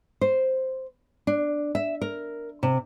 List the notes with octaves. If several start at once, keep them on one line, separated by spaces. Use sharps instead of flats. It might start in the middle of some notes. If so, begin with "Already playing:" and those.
C5
D4
E5
A#4
C3